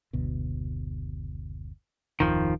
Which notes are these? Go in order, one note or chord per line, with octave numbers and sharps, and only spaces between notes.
F#1 D2 B2
D1 F2 D#3 F3